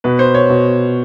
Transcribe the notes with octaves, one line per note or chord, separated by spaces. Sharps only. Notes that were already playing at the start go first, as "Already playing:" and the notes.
B2 B4
C5
C#5
B2